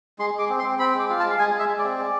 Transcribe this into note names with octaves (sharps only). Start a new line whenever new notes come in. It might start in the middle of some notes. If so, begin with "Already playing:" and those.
G#3 C6
G#3 D6
C4
C6
C4
C4 B5
G#3 D6
F4
A5
G#3
F5
G#3 G#5
G#3
E5
G#3
D5
C4
G#3